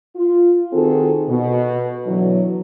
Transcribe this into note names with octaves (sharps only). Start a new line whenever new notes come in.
F4
D#3 C4 F#4 G#4 A4
B2
B2 D3 E3 F#3